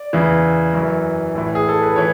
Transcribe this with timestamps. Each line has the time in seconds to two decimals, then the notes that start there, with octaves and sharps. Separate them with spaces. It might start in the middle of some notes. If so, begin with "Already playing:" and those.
Already playing: D5
0.13 E2 C#3 E3
0.73 F#2 E3
1.35 A2 E3
1.55 G#4
1.68 A4
1.82 B4
1.96 E3 C#5